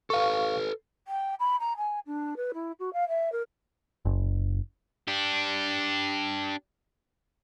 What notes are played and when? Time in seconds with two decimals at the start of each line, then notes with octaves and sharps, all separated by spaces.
0.10 A4 B4 F5 C#6
1.07 G5
1.39 B5
1.60 A#5
1.77 G#5
2.06 D4
2.36 B4
2.54 E4
2.79 F#4
2.93 F5
3.08 E5
3.32 A#4
4.05 F#1
5.08 D4 G4